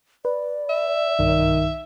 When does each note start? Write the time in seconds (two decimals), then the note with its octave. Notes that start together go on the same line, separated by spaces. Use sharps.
0.25 B4 D5
0.70 E5
1.19 B1 G2 D#3